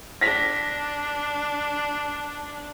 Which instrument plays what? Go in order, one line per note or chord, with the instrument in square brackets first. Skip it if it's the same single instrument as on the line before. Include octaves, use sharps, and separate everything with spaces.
[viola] D4 [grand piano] A#6 B6